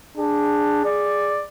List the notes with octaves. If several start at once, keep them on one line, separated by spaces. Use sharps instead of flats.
D4 G#4
D5